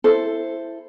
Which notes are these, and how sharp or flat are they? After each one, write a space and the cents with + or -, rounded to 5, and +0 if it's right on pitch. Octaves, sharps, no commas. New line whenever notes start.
E4 +10 A4 +0 C5 +0